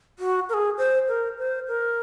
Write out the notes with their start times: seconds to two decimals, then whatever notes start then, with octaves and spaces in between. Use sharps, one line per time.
0.19 F#4
0.49 A#4
0.54 G#4
0.78 C5
1.08 A#4
1.38 C5
1.68 A#4